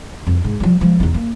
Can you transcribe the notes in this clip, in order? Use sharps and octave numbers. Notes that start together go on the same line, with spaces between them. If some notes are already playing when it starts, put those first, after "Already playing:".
F2
G#2
F3 G3
F3 G#3
E2 D#4
A#3